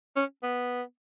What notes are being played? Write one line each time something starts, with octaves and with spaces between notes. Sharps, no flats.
C#4
B3